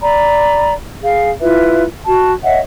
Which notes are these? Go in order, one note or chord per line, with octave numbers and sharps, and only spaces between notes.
D5 A#5 B5
G#4 F5
E4 F4 B4 E5
F#4 A5
C#5 D#5 E5 F#5